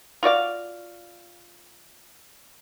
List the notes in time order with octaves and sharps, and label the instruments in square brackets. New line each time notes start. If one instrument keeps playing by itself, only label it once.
[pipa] F4 F#4 D5 F5